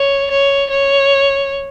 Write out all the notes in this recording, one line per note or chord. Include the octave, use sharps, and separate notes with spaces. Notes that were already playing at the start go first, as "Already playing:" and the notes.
Already playing: C#5
C#5
C#5